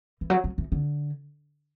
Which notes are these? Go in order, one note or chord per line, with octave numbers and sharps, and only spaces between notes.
E3
F#3
F#3
E3
D3